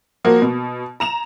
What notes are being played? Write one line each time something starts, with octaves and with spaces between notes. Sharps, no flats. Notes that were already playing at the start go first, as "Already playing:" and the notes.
F3 A#3 F#4 A#4
B2
A#5 E7 F7